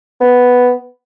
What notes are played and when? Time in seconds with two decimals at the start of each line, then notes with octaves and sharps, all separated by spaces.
0.21 B3